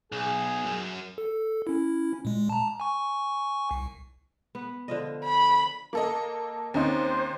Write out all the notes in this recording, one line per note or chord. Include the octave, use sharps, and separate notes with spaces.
B1 G#4
F#2
A4
C#4 E4
A#2 G#3
A5 A#5
G#5 C#6
C2
B3
D3 F3 D#5
B5
A#3 A4 D#5
D#2 C4 C#4 D#4 C5